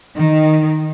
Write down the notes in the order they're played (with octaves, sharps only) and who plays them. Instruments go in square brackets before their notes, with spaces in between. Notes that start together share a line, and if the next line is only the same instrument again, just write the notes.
[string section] D#3